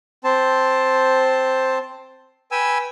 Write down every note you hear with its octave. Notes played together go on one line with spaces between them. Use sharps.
C4 C5 A5
B4 G5 G#5 E6